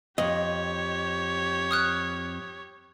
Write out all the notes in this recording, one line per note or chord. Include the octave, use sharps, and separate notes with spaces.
F2 G4 C#5 D#5
D#6 F6 F#6